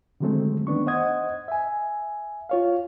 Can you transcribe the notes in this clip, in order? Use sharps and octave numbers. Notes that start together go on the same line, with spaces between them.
D3 D#3 F#3 G#3 A3 C4
D#3 B3 D4 C#6
C5 D#5 F#5 D#6 G#6
E5 G#5
F4 C#5 F5